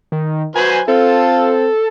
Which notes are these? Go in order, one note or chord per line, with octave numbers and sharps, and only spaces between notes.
D#3
F#3 B4 C5 G#5
C4 F4 A4